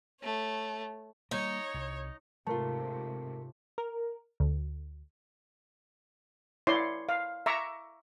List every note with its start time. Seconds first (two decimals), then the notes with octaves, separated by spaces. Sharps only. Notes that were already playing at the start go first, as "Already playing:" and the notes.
0.21 A3 C#5
1.31 G3 A#3 D#4 C#5
1.74 C2
2.47 G#2 C3 A3 F4 A#4 A5
3.78 A#4
4.40 D2
6.67 E4 C#5 D5 C6
7.09 F5
7.46 E5 A#5 C#6 D6